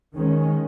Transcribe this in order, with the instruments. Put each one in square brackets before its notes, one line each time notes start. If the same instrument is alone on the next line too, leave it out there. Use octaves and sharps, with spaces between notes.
[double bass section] D#3 G#3 C#4